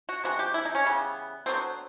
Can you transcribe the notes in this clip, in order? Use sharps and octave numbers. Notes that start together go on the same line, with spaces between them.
F#4
C3 F3 G#3 B3 F#4
G4
E4
D#4
C#4
C#3 E3 G3 B3
D3 F#3 B3 C4